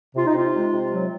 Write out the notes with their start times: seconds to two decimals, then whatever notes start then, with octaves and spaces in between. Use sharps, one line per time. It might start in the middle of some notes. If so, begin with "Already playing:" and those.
0.16 C3 F4
0.26 D#4
0.35 C3 F4
0.54 G#3
0.72 C3
0.92 F#3